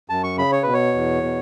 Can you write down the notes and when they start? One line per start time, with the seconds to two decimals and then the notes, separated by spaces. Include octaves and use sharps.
0.09 F#2 A5
0.24 C#6
0.38 C#3 B5
0.52 C#5
0.63 B2 B4
0.73 C#5
0.94 E2
1.23 B2